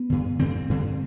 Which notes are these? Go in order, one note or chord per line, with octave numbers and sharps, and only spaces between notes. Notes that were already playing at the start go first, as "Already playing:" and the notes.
Already playing: B3
G2 D3
G2 D3 C4
G2 D3